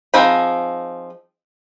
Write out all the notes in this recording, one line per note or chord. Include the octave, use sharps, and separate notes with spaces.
F3 C4 D#4 G#4 B5